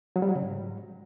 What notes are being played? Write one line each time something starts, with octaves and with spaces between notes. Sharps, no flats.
F#3
G3
F#3
C#3
G#2